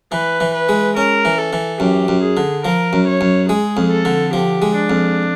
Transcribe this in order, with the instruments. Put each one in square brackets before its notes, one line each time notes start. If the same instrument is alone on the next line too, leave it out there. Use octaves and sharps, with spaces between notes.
[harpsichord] E3 [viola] B4
[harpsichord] E3
[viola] B4
[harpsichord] G#3
[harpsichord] C#4 [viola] A#4
[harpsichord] E3
[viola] A4
[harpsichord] E3
[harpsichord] F#2 [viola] G4
[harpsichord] F#2
[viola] G#4
[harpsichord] D3
[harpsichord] F3 [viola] A#4
[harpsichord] F#2
[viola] C#5
[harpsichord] F#2
[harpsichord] G#3 [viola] G#4
[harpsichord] F2
[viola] A4
[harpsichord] D3
[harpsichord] F3 [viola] G4
[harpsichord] G#3
[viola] D4
[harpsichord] F2